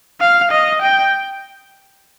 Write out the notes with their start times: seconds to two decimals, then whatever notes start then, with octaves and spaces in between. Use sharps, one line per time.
0.21 F5
0.52 D#5
0.82 G5